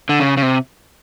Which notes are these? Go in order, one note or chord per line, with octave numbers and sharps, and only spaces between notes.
D3
C#3
C#3
C3